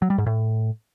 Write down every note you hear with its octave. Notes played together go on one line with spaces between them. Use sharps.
F#3
G3
G#2
A2